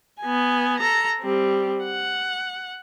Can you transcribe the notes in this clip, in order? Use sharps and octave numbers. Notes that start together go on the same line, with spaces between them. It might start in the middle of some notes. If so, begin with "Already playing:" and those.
B3 G#5
A4 A#5
G3 C4
F#5